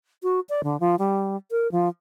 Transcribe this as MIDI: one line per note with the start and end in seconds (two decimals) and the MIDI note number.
0.23 0.40 66
0.49 0.61 74
0.63 0.79 50
0.80 0.95 53
0.99 1.37 55
1.51 1.70 70
1.72 1.88 53